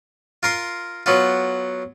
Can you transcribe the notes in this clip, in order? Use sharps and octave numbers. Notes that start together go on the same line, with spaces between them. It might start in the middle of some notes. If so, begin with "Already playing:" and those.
F4 A#4 C6
F#3 B3 F4